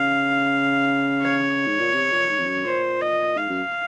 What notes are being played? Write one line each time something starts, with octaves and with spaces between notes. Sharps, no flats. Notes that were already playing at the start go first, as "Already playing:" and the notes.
Already playing: C#3 F5
C#5
G#2
A#2
C3
A#2
G#2
F2
F#2
A#2 C5
D#5
G#2 F5
F#2